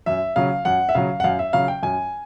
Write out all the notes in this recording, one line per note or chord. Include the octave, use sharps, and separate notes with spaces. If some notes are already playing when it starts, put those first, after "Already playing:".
F#2 E5
C#3 F#3 F5
F#2 F#5
E5
C#3 F#3 F5
F#5
F#2 F5
E5
C#3 F#3 F5
G5
F#2 G#5